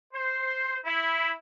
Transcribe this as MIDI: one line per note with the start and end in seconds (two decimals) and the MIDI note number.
0.14 0.76 72
0.85 1.31 64